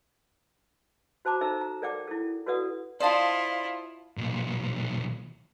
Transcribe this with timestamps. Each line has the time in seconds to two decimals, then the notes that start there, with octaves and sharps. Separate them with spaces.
1.25 F#4 C5 A5 A#5 D6
1.41 D#4 A4 C5 E5 A#5 E6
1.61 A#5
1.82 A4 A#4 D5 F#5 G5 D6
2.08 E4 A4
2.46 F#4 A4 B4 D5 F#5 D#6
3.00 E4 F4 C5 D5 D#5 F5 A5
4.17 B1 A#2